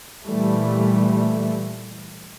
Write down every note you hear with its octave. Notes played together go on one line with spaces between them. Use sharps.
A#2 E3 G3 A3